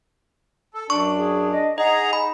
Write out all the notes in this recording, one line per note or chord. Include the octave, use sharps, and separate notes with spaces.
A4
F#2 D4 C#6
G#4
D#5
D#4 G#4 D#5 F#5 A#5
B5